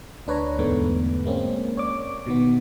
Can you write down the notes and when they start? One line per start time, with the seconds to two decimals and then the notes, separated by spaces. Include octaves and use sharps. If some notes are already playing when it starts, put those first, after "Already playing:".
0.27 D2 D4 B4 C#5 A#5
0.58 E2 G#2 D3 A3 B3
1.25 G#3 A#3 C4 C#4
1.77 C#5 D5 D6
2.26 B2 D#3 B3